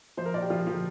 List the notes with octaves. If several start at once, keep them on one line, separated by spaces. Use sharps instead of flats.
F3 C5
A#4
A#2 D5
G4
F3 F4
F3